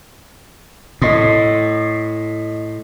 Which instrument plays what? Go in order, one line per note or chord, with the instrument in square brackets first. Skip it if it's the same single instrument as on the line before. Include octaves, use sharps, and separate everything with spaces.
[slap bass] A2 [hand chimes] D#5 C6 D#6